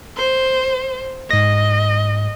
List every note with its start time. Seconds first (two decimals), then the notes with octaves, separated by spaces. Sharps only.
0.17 C5
1.31 G#2 D#5 A#6